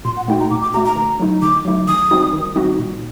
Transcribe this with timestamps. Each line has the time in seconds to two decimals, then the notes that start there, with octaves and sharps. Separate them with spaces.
0.05 A#2 C6
0.17 F#5
0.28 A3 D#4 F#4 G5
0.40 A#5
0.50 A#2 D6
0.62 D6
0.74 A3 D#4 F#4 A#5
0.85 A#5
0.96 D3
1.20 F#3 A3 D#4
1.42 D3 D6
1.65 F#3 A3 D#4
1.88 D#3 D#6
2.11 G3 C4 D#4 F#4
2.33 D#3
2.56 G3 C4 D#4 F#4
2.79 A#2